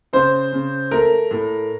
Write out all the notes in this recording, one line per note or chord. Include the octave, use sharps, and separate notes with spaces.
C#3 C5
C#3
A3 A#4
A2